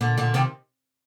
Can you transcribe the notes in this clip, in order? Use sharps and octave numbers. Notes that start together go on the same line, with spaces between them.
A#2 D3
A#2 D3
C3 D#3